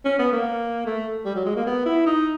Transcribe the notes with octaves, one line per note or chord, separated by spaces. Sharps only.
C#4
B3
A#3
A3
G3
F#3
G#3
A#3
B3
E4
D#4